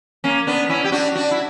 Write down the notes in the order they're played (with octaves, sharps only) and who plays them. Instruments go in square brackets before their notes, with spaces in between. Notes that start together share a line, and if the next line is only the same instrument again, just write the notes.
[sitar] A#3 C#4
B3 D4
C#4 E4
G4
D4 F#4
D4 F#4
E4